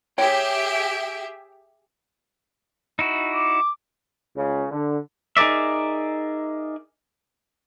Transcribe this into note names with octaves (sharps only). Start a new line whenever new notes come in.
G4 G#4 C#5 E5 G5
D#4 E4 F#4
D6
C#2 C#3
D3
D#4 G#4 A#4 D5 E5